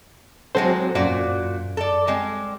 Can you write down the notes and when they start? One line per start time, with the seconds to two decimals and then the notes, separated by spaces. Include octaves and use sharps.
0.55 F#3 G#3 C4 F#4 A4 C5
0.95 F#2 A#2 F#4 D5
1.77 A4 D5
2.07 G3 G#3 C4